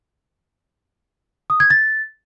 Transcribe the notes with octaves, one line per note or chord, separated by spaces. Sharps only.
D#6
G#6
A6